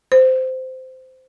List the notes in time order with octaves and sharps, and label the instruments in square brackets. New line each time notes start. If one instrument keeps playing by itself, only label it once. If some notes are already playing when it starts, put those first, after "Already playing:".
[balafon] C5